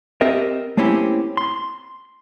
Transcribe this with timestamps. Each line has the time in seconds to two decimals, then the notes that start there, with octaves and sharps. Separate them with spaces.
0.21 C4 G4 A#4 D#5 E5
0.77 A3 A#3 C4 C#4 E4 G4
1.37 C6